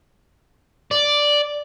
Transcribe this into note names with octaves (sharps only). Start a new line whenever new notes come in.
D5